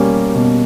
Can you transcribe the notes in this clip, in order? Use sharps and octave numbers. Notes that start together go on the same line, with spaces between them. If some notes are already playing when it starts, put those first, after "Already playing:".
Already playing: B2 G3 A#3 C#4
B2